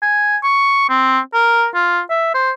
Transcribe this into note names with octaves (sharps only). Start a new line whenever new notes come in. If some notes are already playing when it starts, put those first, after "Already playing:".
G#5
C#6
C4
A#4
F4
E5
C5